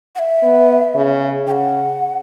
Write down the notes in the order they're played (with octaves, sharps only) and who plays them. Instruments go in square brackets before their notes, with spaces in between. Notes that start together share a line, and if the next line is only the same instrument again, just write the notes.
[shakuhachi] F#5
E5
[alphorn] B3
C#3
[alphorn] C#3 [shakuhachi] G5
[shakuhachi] F#5